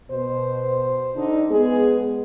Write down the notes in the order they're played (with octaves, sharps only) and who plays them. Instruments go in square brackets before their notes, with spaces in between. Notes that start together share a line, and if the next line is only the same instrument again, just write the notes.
[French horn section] B2 [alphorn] C5
[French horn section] D3 D4 D#4
[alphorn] G#3 [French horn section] B3 G#4